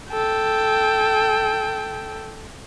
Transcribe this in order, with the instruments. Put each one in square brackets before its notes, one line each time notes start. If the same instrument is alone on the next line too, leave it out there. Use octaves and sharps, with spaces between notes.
[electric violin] A4 G5